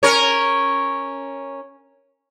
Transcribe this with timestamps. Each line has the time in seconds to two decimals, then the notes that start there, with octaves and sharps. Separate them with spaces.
0.03 C#4 A#4 C#5